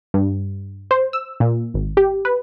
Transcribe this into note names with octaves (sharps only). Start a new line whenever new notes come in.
G2
C5
E6
A#2
G#1
G4
B4